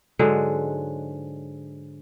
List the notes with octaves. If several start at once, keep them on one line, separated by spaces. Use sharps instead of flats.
G#2 D3 F#3 G#3